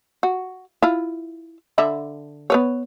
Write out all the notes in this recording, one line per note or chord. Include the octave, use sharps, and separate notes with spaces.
F#4
E4 F4
D3 E5 B5
B3 B4 C#5